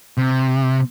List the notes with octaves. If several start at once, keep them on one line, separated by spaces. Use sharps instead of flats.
C3